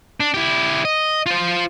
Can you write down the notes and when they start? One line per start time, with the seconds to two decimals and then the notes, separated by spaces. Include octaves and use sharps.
0.20 D4
0.34 E4 G4
0.85 D#5
1.26 F4 C5